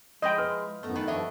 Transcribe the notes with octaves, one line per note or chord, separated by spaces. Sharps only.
F3 G#3 E4 C5 D#5 G5
B4 F6
F#2 A2 A3 B3 A#5
D#3 A3 B3 D#4 A4
G2 F3 D4 C#5 D#5 E5